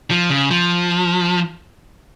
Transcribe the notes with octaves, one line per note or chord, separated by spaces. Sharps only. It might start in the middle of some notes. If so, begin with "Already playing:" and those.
F3
C#3
F3